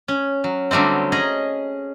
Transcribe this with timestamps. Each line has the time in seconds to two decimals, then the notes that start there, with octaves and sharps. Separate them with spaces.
0.08 C#4
0.44 F#3
0.71 D3 F#3 G3 A3 C4
1.12 C#4 G#4 D#5 A#5